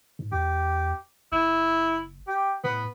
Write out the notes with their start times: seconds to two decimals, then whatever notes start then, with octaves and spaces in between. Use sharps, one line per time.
0.19 G#2
0.32 E2 G4
1.32 F#1 E4
2.27 G4
2.64 A2 B3